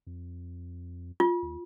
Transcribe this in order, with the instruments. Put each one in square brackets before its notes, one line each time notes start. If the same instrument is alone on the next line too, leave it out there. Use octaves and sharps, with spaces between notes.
[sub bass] F2
[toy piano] F4
[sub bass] D#2